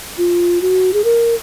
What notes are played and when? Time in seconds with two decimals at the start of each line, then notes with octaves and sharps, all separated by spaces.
0.18 F4
0.62 F#4
0.93 G#4
1.04 A#4